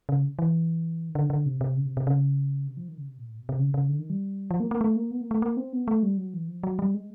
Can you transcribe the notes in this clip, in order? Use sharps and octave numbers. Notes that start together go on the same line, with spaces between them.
C#3
E3
D#3
D3
D3
C3
C3
C#3
C3
C3
C#3
C3
F3
D#3
C#3
C3
A#2
A2
B2
C3
C#3
C#3
D3
D#3
G3
F3
A#3
A#3
A3
A#3
B3
A#3
A3
A#3
C4
B3
A3
G3
F#3
E3
F3
F#3
G3
G#3